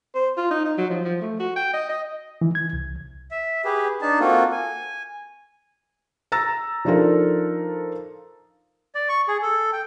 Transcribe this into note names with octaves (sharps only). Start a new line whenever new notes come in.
C5
F4
D#4
D#4
F#3
F3
F3
A3
F#4
G5
D#5
D#5
E3
G#6
C2
E5
G4 G#4 B4
D4 D#4 A5
A#3 C4 F4 F#4 A4
G#5
A#5 E6 A6 A#6
F3 D4 D#4 F4 A4 A#4
D5
C#6
G#4
A4
G5